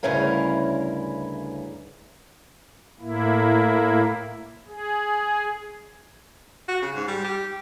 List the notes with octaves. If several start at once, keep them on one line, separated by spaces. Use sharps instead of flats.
D2 G2 C#3 C#4 E4 A#4
A2 A#3 E4
G#4
F#4
C#3
G#2
G3
G4